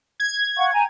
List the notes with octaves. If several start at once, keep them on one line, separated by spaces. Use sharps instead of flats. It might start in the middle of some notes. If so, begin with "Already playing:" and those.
G#6
F5 F#5 C#6
G5 G#5 A#5